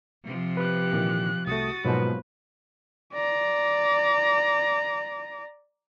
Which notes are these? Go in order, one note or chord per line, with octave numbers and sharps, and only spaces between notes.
C3 F3
G4 B4 F#6
A#2 D#3 E3
C2 A3 F#4 D#6 A6
G#2 B2 F3 F#3 A#3 B4 C5
D5 A#5